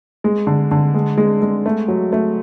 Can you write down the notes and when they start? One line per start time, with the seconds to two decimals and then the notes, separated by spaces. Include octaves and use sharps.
0.24 G#3
0.47 D3
0.71 D3
0.94 G#3
1.18 G#3
1.42 G#3
1.66 A3
1.88 F#3
2.13 A3